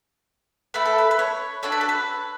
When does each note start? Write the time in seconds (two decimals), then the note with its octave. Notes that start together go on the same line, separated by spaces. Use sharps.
0.74 A3 E4 A4 B4
0.85 A4
0.98 B4
1.11 B4
1.19 C#5
1.63 D4 F#4 A4 C#5
1.72 B4
1.81 A4
1.89 B4